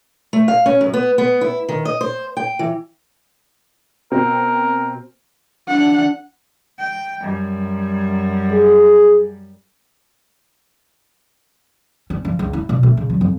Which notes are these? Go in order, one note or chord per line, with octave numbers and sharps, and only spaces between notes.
A3
F5
C#4
F#2
B3
B3
E4
D#3
D#5
C5
G5
E3
B2 C4 A#4
D4 F#5
G5
F#2 G3
G#4
C#4
F3
C#2
E4
B2
A3
C#3
F#3
F2